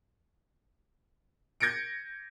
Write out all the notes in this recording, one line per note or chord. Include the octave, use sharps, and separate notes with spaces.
G6 G#6 A#6 C#7 D7